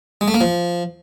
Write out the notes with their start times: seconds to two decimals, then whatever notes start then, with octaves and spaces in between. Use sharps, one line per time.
0.21 G#3
0.28 A3
0.34 A#3
0.41 F3